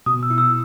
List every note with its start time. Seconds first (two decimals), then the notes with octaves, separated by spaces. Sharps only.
0.06 B2 D#6
0.23 E6
0.30 E4
0.38 E6